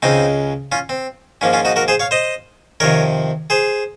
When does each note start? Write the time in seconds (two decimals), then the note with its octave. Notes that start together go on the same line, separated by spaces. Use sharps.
0.02 C#2 C#3 G#3 C4 D#4
0.72 C#4 F4
0.89 C4
1.41 G#2 F3 A#3 C#4
1.53 C#4 F4
1.65 D#4 F#4
1.76 F#4 A#4
1.88 G#4 C5
2.00 C#5 F5
2.11 C5 D#5
2.80 F2 C3 D#3 A#4 C#5
3.50 G#4 C5